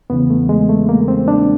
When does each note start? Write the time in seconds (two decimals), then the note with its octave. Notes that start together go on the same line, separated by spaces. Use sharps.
0.10 E2 C#3 E3 B3
0.30 A3
0.49 G#3
0.69 A3
0.89 A#3
1.08 C4
1.28 D4